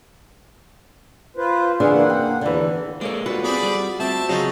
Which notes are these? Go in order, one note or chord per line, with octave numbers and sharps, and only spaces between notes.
F4 B4 C5
C#3 E3 D4 G#4 F5 F#5
A#3 F#5
G5
E2 D3 E3
G#3 A#3 A4 C#5 D5
G3 F4 F#4 B4
B3 C4 G#4 D5 B5
G3
A3 C4 E5 A5
C#3 F3 F#3 D#4